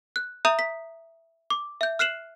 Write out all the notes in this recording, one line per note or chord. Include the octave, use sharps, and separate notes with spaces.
F#6
E5 A#5 D#6 G6 D#7 F7
B6
D6
E5 G6
F6 F#6 C7 E7 F#7